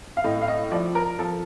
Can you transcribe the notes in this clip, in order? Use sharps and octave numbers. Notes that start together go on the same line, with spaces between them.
F5
A2 D#5
F5
D#5
F3 D5
A#4
F3 A4